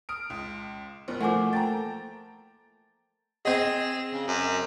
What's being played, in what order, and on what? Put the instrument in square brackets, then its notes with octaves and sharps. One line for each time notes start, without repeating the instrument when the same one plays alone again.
[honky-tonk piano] D#6 F6 D7
C#2
[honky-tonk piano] F#1 B2 [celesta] C5
[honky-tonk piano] E3 F3 [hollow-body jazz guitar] A3 A#3 C5 [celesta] F#5 G#5 D6
[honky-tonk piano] G5 A5 A#5 [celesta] A6
[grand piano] C4 D#5 [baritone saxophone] G#4
[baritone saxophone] C#3
F#2